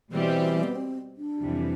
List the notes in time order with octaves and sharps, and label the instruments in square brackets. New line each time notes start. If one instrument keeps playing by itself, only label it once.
[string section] B2 G3 C4 G4 [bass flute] E3
[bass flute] B3
C4
D4
[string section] F2 C3 E3 G3